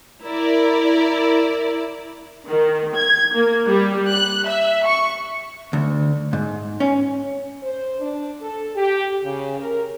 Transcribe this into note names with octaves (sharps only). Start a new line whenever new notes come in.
E4 A#4 D5
D#3
G#6
A#3
G3
F#6
E5
C#6
D2
G#2
C#4
C5
D4
A4
G4
C#3
A#4